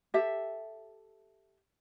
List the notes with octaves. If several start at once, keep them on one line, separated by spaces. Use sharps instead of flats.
G4 A4 E5